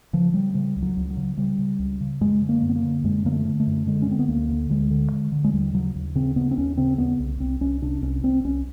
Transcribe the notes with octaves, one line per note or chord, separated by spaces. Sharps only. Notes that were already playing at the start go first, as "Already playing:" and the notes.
C#3 F3
C#3 G3
C#3 G3
C#2
F#3
C#2
F#3
C#3
C#3 G3
C#3
C#2
C#3
F#2 G#3
D3
A#3
F#2
B3
A#3
D3
F#2 G#3
D3 A#3
A3
D3
A3
F#2
D3 G#3
C#4
D3 C4
B3
D2 A#3
D3
D2 G#3
D3
D3
D3
G#3
D#2 G3
C#3 F#3
D#2
C#3 C4
C#3 B3
C4
D#2 C#4
C#3 C4
D#2 B3
C2
C2 C4
C2 C#4
C3 D4
C2 C#4
C2 C4
C2 C#4